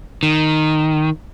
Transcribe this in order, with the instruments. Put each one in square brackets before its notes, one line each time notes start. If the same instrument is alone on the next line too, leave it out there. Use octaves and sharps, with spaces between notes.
[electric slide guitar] D#3